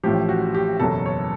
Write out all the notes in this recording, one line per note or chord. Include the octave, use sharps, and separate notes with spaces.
A1 A2 F3 G4
F#4
G4
F#1 E2 B2 F#3 A4
C#5